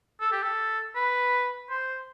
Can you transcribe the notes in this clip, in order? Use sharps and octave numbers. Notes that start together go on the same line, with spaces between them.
A4
G4
A4
B4
C5